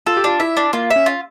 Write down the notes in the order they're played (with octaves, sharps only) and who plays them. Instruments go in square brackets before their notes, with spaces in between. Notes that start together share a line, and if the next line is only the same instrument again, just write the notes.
[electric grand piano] F4 [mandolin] A4
[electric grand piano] G4
[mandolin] D4 [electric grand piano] F4
[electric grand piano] E4 [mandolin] E5
[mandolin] D4
[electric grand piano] A#3 [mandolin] F4
[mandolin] E5
[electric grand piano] C#4
[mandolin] F4